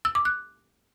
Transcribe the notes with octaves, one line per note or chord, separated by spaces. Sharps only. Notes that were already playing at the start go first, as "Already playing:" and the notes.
E6
D6
F#6